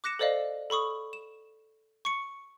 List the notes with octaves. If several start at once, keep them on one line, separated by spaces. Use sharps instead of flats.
D6 F#6 A#6 C#7 E7
A4 C5 D5 D#5 F5
A4 B5 C#6 D#6
E7
C#6 C#7